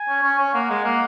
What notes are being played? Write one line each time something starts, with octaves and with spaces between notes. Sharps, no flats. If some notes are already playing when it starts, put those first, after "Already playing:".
Already playing: G#5
C#4
C#4
C#4
A#3 F#5
G#3
A#3